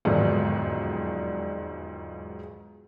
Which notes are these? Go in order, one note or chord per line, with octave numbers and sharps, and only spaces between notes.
E1 B1 F2 G#2 D3 D#3